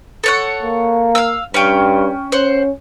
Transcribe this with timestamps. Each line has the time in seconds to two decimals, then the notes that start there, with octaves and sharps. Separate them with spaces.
0.24 A4 C#5 F#5
0.62 A#3
1.15 F5 E6
1.54 G2 C#4 G5
2.32 C#4 C5 F#5